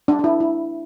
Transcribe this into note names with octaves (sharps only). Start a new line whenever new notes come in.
D4
D4
E4
E4